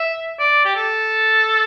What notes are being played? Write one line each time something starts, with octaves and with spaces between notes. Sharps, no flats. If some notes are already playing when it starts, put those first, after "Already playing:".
Already playing: E5
D5
G4
A4